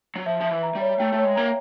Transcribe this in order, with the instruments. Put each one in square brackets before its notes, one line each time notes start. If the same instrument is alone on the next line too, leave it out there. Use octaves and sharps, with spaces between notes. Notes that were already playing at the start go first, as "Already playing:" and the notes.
[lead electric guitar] F#3
[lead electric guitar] F3 [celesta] E5
[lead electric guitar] F3 [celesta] E5
[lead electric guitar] E3
[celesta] A#5
[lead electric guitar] G3
[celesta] C#5
[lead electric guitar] A3 [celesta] G5
[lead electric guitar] A3
[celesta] C#5
[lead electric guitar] G#3
[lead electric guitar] A#3 [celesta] A#5